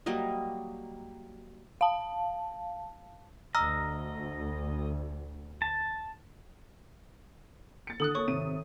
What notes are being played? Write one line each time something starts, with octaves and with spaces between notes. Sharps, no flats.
F#3 G3 A#3 D#5
F5 A5
D2 D#5 A#5 E6 F6
A5
A6 C#7
D3 A4 D#6 F#6
A#3 A4 C#5 C#6
G#1 C3 D#7